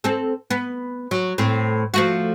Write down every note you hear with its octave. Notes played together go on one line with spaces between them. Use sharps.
C4 A4
B3
F#3
A2 C4
F3 A3 F#4